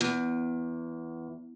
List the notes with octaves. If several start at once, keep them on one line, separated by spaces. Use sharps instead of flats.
E2